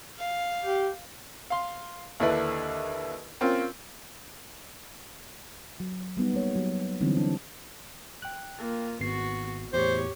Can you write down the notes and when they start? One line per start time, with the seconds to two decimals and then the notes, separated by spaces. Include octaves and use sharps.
0.18 F5
0.64 G4
1.50 F5 C6
2.20 D#2 D3 D4 E4 B4
3.41 A#3 C4 C#4 F4
5.80 F#3
6.17 G3 B3 D#4
6.34 A#3 C#5
6.56 F#3
7.01 D3 E3 F#3 G3 C4 D#4
7.17 D4
8.22 G5 F#6
8.58 A#3 F4
9.00 G#1 B3 F#4 C7
9.73 E2 A2 G4 C5 C#5